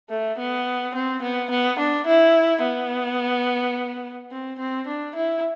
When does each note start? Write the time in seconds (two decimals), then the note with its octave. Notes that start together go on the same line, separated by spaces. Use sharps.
0.10 A3
0.39 B3
0.95 C4
1.22 B3
1.50 B3
1.79 D4
2.06 E4
2.63 B3
4.31 C4
4.59 C4
4.87 D4
5.15 E4